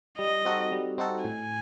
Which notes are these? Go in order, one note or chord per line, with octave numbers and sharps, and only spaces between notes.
G3 D#5
C4 D#4 F#4 A4
G3
C4 D#4 F#4 A4
A2 G#5